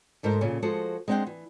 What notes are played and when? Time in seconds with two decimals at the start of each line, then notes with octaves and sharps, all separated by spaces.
0.23 D2 G#2 A4 A#4 C5
0.41 A#2 C#3 C#4
0.62 F3 G#3 F#4 A4 C5
1.08 G#3 C4 D4 F#4 F#5 G5
1.27 E3